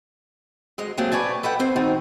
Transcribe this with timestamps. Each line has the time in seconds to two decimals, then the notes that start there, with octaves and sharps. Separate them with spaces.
0.78 D2 G#3 D#5
0.97 F#3 A3 A#3 C4 G#4
1.12 B4 C#5 D5 G#5 A5
1.43 A4 B4 D#5 F#5 G5
1.59 C4 C5
1.76 D#3 C4 D#4 F#4